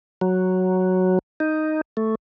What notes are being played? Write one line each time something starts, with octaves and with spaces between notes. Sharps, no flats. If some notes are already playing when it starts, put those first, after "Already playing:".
F#3
D#4
A3